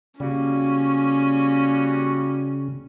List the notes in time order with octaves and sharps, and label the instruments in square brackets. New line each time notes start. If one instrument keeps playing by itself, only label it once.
[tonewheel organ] C#3 [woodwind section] G3 A#3 F#4 [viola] C#4